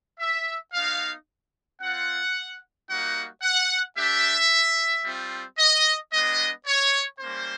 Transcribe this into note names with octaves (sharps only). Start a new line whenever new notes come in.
E5
B3 D#4 F#4 F5
C4 F4 F#5
G3 A#3 D#4 F#4 F#5
F#5
A3 D4 G4 E5
G3 C4 F4
D#5
G#3 B3 D4 D#5
C#5
G3 A#3 C#4 C5